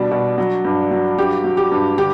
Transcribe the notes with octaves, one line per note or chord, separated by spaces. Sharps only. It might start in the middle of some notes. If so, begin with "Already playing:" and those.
Already playing: B2 G3 D4
B2
F#3
G2
F#3
G2 G4
F#3
G4
G2
D3 G4